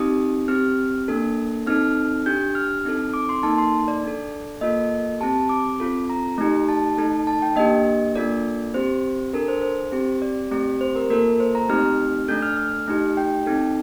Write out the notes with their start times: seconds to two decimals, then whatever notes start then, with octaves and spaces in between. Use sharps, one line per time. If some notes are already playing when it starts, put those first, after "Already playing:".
Already playing: C4 D#4 G4 D#6
0.48 C4 G4 F6
1.08 A#3 D4 A4
1.67 C4 D#4 A4 F6
2.26 D4 G4 G6
2.55 F6
2.85 C4 D#4 A4
3.13 D6
3.29 C6
3.43 A#3 D#4 A4 A5
3.58 C6
3.88 D5
4.03 D4 A4
4.61 A#3 F4 A4 D#5
5.20 C4 G4 A5
5.49 D6
5.80 C4 F4 A4
6.10 A#5
6.38 A3 D#4 G4
6.69 A5
6.97 A3 D#4 A4
7.27 A5
7.42 G5
7.56 A#3 D4 G4 D#5
8.16 A#3 D4 F4 A4 D5
8.74 C4 G4 C5
9.33 D4 A4 A#4
9.48 C5
9.62 C5
9.92 C4 G4
10.22 D5
10.51 A3 C4 G4
10.81 C5
10.96 A#4
11.10 A#3 F4 A4 A#4
11.40 C5
11.55 A#5
11.69 A3 C4 D#4 G4 F6
12.28 A3 D4 A4 G6
12.42 F6
12.57 F6
12.87 A3 D#4 G4
13.17 G5
13.46 C4 D#4 A4